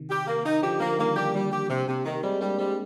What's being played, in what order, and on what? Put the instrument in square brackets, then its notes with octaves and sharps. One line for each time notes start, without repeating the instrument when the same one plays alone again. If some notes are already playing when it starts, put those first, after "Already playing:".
Already playing: [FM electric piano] C3 D#3
[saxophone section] G4
A#3
D#4
[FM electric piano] D3 F3 [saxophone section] G4
[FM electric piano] D3 F3 [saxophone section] A#3
[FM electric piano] D#3 G3 [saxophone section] A#3
[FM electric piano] A#3 D4 [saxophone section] G4
[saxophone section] G3
G4
C3
C3
D#3
[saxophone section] G3 [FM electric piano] G#3 C4
[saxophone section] G3 [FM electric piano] A#3 D4
[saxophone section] G3 [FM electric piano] G#3 C4